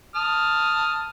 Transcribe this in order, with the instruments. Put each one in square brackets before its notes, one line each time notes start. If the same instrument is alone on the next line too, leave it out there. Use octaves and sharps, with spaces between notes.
[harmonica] A5 D#6 F6